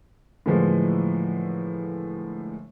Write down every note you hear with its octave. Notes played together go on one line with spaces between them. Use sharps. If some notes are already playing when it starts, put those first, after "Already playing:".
A2 D3 E3 F3 G#3 A#3